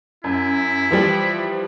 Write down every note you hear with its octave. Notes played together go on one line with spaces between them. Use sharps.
F#2 E4
E3 F3 G3